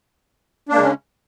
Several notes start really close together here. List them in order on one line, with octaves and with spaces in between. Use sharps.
D4 A#3 G#3 C#3 C#4